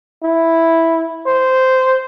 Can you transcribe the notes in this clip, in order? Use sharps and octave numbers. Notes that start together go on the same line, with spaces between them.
E4
C5